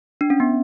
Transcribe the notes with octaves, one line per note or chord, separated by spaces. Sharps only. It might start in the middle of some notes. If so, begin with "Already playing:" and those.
D4
C#4
B3